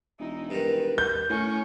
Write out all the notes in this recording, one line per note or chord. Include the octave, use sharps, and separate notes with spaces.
E1 D#4 E4
G2 D#3 B4
G6
A2 C#4 C#6